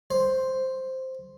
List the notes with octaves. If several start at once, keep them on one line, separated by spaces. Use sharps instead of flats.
C5